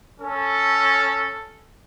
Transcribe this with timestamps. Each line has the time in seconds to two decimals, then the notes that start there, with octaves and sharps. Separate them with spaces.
0.19 C#4 A4